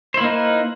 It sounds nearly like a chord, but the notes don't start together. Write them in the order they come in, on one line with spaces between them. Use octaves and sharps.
C5 E4 A#3 D#4 B4